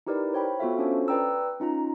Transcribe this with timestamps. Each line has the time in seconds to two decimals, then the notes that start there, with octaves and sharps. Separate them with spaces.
0.07 D#4 E4 G4 A#4 B4 D5
0.33 C5 C#5 G5 B5
0.59 B3 F4 F#4 A4 E5 F5
0.79 C#4 D4 F4 A4 C5 C#5
1.08 B4 D5 G5 A#5 E6
1.60 C#4 D#4 F4 A#5